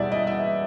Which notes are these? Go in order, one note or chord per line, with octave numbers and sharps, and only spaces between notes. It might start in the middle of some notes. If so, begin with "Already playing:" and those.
Already playing: E2 B2 G3 D5 E5
D#5
E5